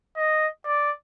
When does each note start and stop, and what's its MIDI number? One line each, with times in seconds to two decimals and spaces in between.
0.17 0.47 75
0.66 0.91 74